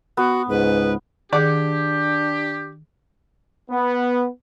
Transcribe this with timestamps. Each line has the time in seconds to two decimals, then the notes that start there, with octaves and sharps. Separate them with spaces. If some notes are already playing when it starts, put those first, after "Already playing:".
0.17 B3 F#4
0.49 C#2 G#2 B4
1.33 D#3 D4 G4 G#4 D5 F#5
3.71 B3